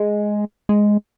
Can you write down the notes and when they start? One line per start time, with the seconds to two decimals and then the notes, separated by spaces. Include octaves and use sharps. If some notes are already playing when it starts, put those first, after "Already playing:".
Already playing: G#3
0.69 G#3